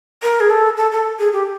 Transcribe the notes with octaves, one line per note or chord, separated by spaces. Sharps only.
A#4
G#4
A4
A4
A4
G#4
G4